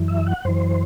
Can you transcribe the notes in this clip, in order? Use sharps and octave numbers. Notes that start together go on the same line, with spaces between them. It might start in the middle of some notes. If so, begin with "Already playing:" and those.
Already playing: F#2 E3
E5
F#5
F#2 E3 C5